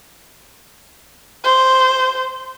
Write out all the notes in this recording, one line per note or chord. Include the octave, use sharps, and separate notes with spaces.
C5